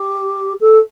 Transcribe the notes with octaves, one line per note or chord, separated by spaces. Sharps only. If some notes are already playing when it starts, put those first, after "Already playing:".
Already playing: G4
A4